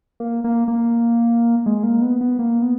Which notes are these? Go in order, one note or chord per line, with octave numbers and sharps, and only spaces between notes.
A#3
A#3
A#3
G#3
A#3
B3
B3
A#3
B3